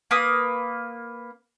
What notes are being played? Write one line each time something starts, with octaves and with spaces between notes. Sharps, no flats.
A#3 B4 D#6